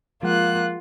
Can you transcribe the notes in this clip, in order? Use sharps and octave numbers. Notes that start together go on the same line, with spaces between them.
F3 G#3 A#3 F4 F#5 F#6